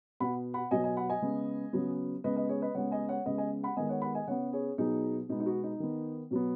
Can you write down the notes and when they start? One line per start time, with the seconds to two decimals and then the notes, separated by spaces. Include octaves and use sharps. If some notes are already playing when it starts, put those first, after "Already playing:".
0.20 B2 B3 F#5 B5
0.54 F#5 B5
0.71 B2 F#3 B3 D#5 G#5
0.84 D#5 G#5
0.97 F#5 B5
1.09 D#5 G#5
1.22 C#3 G#3 B3
1.73 C#3 F#3 B3
2.24 C#3 G#3 B3 B4 D#5
2.37 B4 D#5
2.49 G#4 C#5
2.62 B4 D#5
2.74 C#3 G#3 B3 C#5 F#5
2.91 D#5 G#5
3.08 C#5 F#5
3.26 C#3 G#3 B3 B4 D#5
3.38 D#5 G#5
3.64 F#5 B5
3.77 D#3 G#3 B3 D#5 G#5
3.89 C#5 F#5
4.02 F#5 B5
4.15 D#5 G#5
4.27 C#3 B3 C#5 F#5
4.53 G#4 C#5
4.78 B2 F#3 B3 D#4 G#4
5.29 B2 G#3 B3 D#4
5.40 D#4
5.46 F#4
5.63 D#4
5.80 D#3 B3
6.31 B2 F#3 B3